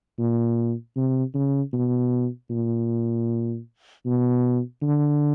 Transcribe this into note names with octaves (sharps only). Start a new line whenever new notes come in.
A#2
C3
C#3
B2
A#2
B2
D3